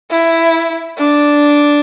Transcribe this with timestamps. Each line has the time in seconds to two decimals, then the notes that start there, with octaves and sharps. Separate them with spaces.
0.11 E4
0.98 D4